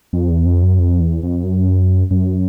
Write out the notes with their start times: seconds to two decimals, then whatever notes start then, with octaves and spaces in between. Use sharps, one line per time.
0.13 F2
0.30 E2
0.46 F2
0.63 F#2
0.79 F2
1.00 E2
1.23 F2
1.44 F#2
2.11 F#2